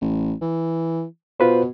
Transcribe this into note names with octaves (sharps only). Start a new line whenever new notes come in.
A1
E3
B2 F4 B4 C5